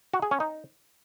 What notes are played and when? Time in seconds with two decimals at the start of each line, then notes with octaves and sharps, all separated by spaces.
0.14 F#4
0.22 G#4
0.31 C#4
0.40 D#4